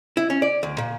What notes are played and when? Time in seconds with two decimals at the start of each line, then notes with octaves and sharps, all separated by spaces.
0.17 E4
0.30 C#4
0.42 D5
0.63 D2
0.78 A#2